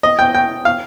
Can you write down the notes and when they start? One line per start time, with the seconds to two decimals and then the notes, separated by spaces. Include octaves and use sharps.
0.03 D#5
0.19 G5
0.35 G5
0.65 F5